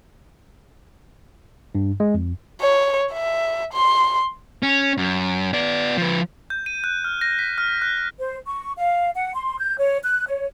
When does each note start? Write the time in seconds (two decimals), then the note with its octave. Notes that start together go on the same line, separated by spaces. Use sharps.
1.75 G2
2.00 G#3
2.14 F2
2.61 C#5
3.12 E5
3.73 C6
4.63 C#4
4.98 F#2
5.54 B3 D5
5.97 F3 B4
6.50 G6
6.66 D#7
6.84 F#6
7.04 F6
7.21 A#6
7.39 B6
7.58 F6
7.82 F#6
7.97 F#6
8.20 C5
8.47 C#6
8.76 F5
9.15 F#5
9.35 C6
9.59 G6
9.79 C#5
10.04 F#6
10.26 C#5